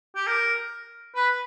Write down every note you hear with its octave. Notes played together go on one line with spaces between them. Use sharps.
G4
A#4
B4